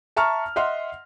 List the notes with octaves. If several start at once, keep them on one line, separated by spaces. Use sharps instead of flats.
E5 A5 A#5 C#6 F6
D#5 E5 F#5 C6 F6